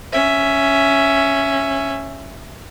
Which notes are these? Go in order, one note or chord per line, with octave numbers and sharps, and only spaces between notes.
C#4 E5